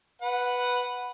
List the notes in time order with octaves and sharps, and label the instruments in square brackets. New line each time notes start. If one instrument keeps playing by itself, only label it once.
[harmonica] B4 F#5